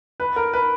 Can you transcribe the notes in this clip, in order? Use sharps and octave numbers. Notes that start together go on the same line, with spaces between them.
B4
A#4
B4